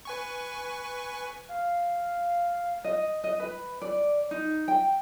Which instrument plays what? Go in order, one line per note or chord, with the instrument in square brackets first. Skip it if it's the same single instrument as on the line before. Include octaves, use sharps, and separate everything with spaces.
[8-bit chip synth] B4 G#5 C#6
[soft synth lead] F5
[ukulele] D#5
D#5
B4
D5
D#4
G5